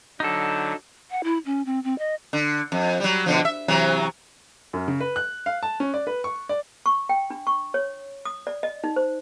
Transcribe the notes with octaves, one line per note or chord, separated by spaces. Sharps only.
D3 F#3 D#4 A4
F#5
E4
C#4
C4
C4
D#5
D3
F2
F#3 G3
B2 D3 F3
E5
C3 E3 F#3
F#2
C#3
B4
F#6
F5
A5
C#4
D5
B4
C#6
D5
C#6
G5
D4
C#6
C#5
D#6
D5
D#5
D#4
C5